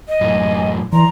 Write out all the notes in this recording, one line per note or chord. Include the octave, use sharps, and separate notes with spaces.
D#5
F#2 A2 G#5
E3 D5 A#5 C6